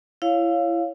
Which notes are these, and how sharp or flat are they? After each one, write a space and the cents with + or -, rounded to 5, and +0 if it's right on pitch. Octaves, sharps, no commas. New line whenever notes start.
E4 +25 C#5 +0 F5 +0